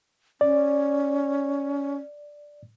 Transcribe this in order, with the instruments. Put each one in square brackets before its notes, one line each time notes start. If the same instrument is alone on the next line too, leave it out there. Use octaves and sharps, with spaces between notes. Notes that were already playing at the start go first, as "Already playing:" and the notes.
[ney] C#4 [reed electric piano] D5